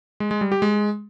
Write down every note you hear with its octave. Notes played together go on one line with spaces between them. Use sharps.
G#3
G#3
G3
G4
G#3